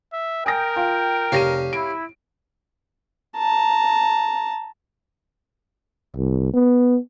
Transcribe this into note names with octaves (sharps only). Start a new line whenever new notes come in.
E5
A#4 G5 G#5 D#6 A#6
F4
F1 G4 C#5 F5 A#6 D#7
E4 D7
A5 A#5
C2
B3